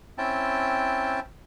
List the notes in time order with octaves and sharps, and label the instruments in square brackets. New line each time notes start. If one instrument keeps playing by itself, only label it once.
[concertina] C4 C#4 E4 G5 A5